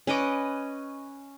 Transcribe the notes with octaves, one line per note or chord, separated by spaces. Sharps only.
C#4 B4 D#5 D6